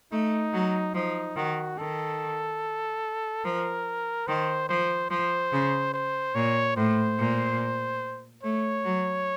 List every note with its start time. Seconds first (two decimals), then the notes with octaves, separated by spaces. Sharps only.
0.12 A3 D#4
0.54 F#3
0.95 F3 D#4
1.36 D#3 F#4
1.78 D#3 A4
3.44 F3 A#4
4.27 D#3 C5
4.69 F3 C5
5.10 F3 C5
5.52 C#3
5.94 C5
6.35 A#2 C#5
6.77 A2 C5
7.19 A#2
8.43 A3 C#5
8.85 F#3